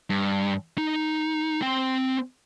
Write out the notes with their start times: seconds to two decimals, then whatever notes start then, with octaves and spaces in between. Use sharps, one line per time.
0.10 G2
0.78 D#4
1.62 C4 G5